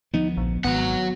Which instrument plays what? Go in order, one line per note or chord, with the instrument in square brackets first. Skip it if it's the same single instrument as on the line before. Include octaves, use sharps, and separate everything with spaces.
[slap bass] D2 F3 B3 [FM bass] D#4
[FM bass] A#1
[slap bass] G#1 [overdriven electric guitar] F#3 F#5 [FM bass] B3